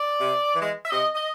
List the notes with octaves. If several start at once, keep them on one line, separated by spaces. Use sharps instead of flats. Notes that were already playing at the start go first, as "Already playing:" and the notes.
Already playing: D5
C3
E3 G#3
E5
C3 D#5
D#5